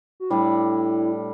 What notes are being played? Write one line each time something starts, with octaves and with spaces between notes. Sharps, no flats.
F#4
A2 G3 D4 E4